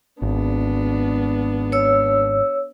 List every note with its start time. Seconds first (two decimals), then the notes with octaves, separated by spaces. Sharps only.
0.22 G#1 B3 D4
1.72 C#5 E6